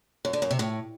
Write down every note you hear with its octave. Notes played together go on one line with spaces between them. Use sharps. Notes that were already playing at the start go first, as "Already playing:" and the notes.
F#2
D3
F#2
C3
A2